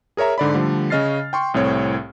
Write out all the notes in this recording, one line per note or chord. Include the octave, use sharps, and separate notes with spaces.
G#4 A#4 C#5 E5 A#5
G#2 D3 D5 B5
D3 F3 G3 A3
C#3 C#4 D#5 F6 A6 C7
G5 C6 C#6
C2 A2 C4 C#5